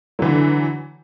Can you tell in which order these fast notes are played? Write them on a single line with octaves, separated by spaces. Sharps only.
F#3 E3 D3